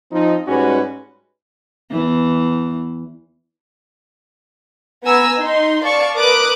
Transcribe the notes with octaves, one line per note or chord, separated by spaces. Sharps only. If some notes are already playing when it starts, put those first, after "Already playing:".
F3 C4 D#4
G#2 G3 G#3 C#4 F#4 B4
E2 E3
B3 G#5 A#5 E6
D#4 C6
D5 F5 A5 C#6
A#4 B4 D6 D#6 F#6